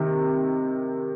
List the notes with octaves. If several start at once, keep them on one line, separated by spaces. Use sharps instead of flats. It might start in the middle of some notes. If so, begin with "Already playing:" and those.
Already playing: C3 D#3